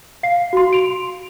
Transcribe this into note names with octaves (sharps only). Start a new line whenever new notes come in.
F5 C7
F#4 C6
D7 F7